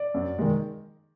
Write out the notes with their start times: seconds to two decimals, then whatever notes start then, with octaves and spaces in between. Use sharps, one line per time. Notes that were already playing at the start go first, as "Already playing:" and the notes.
Already playing: D5
0.14 F#2
0.39 D#3 G#3